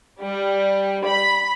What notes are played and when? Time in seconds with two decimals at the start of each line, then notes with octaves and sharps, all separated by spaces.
0.21 G3
1.06 B5